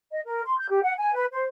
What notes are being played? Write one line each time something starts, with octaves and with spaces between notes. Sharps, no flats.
D#5
A#4
C6
G6
G4
F#5
G#5
B4
C5